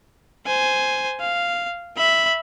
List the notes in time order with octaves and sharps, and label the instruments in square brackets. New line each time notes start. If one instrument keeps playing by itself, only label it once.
[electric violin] C5 G#5
F5
E5 B5